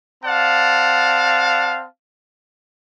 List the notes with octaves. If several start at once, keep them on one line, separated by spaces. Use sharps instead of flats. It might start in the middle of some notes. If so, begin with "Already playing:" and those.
C4 D5 F5 F#5 A5